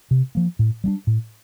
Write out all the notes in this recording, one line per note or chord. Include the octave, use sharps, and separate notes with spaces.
C3
F3 A#3
A2
G3 A#3 D4
A2